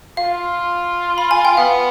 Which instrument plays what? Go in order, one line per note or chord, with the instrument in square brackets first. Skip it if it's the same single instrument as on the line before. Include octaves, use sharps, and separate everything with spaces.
[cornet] F4 [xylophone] F5
[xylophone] B5
G#5
G5
[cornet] B3 [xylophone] F5